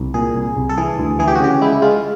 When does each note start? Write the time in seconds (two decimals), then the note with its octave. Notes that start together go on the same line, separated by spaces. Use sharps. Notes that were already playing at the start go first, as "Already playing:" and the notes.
Already playing: C2
0.14 A#2 G#4
0.36 C2
0.57 C2
0.69 A4
0.77 E3 G#4
0.99 D2
1.19 E3 G#4
1.28 G4
1.35 F#4
1.40 C#3 G4
1.61 G#3 E4
1.72 E4
1.82 G#3 F4